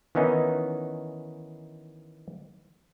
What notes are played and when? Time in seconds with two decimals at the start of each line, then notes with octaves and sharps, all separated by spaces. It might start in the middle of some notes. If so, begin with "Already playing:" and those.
0.15 D#3 E3 B3 C#4 D#4